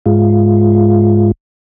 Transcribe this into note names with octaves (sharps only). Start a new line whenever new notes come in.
G#2 G#3 F4